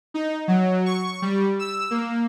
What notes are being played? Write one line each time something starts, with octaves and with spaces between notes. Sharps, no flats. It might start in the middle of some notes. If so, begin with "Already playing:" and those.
D#4
F#3
C#6
G3
E6
A#3